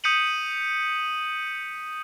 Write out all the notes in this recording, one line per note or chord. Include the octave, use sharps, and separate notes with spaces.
D#6 G6 B6 C#7 D#7 F#7